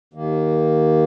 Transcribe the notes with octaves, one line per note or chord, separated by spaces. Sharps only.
D#2 D#3 A#3